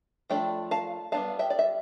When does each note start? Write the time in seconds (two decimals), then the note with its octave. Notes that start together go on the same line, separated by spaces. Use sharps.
0.30 F3 A3 D4 G5 B5
0.71 F5 A5
1.12 G3 B3 D4 F5 A5
1.39 E5 G5
1.50 D5
1.59 E5